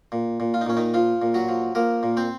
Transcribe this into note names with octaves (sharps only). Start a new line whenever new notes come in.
A#2
A#2
F4
D#4
A#2 C#4
D#3 D#4
F3 F4
A#2
F#3 F#4
F3
F3 A#3 A#4
A#2
C4 C5